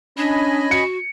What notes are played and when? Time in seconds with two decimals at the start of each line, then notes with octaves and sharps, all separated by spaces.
0.18 C#4 D4 D#5 G#5 B5
0.71 F#4 C#7